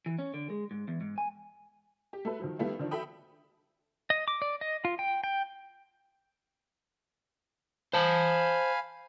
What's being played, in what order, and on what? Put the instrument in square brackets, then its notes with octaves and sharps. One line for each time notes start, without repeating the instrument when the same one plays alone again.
[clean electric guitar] E3
C#4
D3
G#3
G#2
E2
G#2
G#5
[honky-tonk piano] G4
A3 F#4 A4 B4
D#3 F3 F#3
D#3 G3 A3 B3 E4 F4
D3 D#3 F3 D4
F#4 A4 E5 G5 B5 D#6
[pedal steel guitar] D#5
D6
D5
D#5
F4
G5
G5
[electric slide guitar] C5 A5 [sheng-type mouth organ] F5 G#5 B5